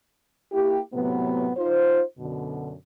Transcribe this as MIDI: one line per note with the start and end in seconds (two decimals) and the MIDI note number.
0.51 0.79 58
0.51 0.79 64
0.51 0.79 67
0.94 1.50 45
0.94 1.50 48
0.94 1.50 54
0.94 1.50 59
1.57 2.00 63
1.57 2.00 65
1.57 2.00 72
2.18 2.73 42
2.18 2.73 47
2.18 2.73 50